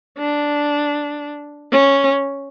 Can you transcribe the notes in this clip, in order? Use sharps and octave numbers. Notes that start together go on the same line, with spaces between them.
D4
C#4